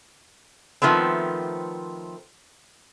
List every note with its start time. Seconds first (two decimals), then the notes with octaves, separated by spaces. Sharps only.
0.82 D#3 F3 A3 B3 C4